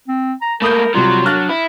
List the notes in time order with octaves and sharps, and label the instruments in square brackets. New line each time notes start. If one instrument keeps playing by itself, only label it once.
[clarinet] C4
A#5
[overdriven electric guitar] A3 A#3 [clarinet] A#4 [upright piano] B5 D#6 G6
[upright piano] C3 G3 [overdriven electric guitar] F#3 [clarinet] F4
[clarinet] D4 [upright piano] F6 F#6 A6
[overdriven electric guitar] E4